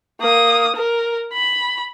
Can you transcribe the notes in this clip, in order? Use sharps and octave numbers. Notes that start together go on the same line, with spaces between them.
A#3 D#6
A#4
B5